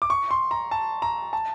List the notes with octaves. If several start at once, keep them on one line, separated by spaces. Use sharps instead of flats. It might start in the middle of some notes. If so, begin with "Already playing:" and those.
D6
C#6
C6
A#5
A5
A#5
A5